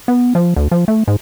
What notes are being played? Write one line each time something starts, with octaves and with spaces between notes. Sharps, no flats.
B3
F3
D2
F3
A3
G#2